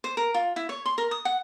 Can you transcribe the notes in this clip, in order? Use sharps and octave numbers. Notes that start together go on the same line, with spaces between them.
C5
A#4
F4
E4
C#5
C6
A#4
D#6
F#5